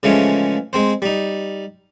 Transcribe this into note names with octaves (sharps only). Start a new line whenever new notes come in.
C#3 E3 F3 G#3 A3 C#4
G#3 C4 C5
G3 D#4